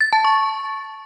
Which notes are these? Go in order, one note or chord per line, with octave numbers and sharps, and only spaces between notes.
A6
A5
C#6